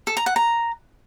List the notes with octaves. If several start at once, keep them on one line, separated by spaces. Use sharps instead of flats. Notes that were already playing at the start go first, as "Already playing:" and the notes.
A4
A#5
F#5
A#5